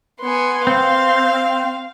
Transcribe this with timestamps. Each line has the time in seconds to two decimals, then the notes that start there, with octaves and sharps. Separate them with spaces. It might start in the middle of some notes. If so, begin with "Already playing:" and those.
0.21 B3 G#5 C6
0.67 C4 F5